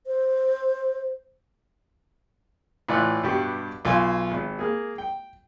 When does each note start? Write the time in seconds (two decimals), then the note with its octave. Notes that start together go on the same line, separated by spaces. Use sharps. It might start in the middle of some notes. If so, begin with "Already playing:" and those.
0.06 C5
2.89 A2 E3 F4 D5 F#6
3.23 G2 B2 G3 F#4 G4
3.85 B1 F4 F5 G#5
4.31 G#1
4.59 A#3 G#4
4.98 G5